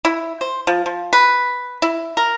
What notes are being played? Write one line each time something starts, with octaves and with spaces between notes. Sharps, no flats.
E4
C5
F3
F3
B4
E4
A#4